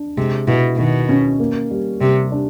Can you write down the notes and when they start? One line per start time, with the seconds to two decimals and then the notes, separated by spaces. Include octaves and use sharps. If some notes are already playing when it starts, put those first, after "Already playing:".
Already playing: D4
0.18 C3 G#3
0.47 B2 E4
0.78 B2 D#3
1.09 C#4
1.40 A#3
1.71 G3
2.01 C3 G3
2.32 D4